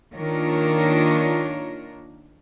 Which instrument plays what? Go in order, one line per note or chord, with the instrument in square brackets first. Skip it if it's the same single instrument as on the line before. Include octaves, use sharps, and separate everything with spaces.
[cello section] D#3 A#3 D4 F4 A#4 C#5